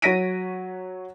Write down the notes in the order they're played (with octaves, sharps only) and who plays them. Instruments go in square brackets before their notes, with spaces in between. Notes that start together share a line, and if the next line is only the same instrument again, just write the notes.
[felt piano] F#3 C#5 A#6 B6 D7 D#7